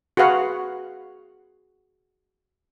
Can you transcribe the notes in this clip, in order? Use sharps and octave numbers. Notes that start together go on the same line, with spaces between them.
F#4 G#4 B4 F5 F#5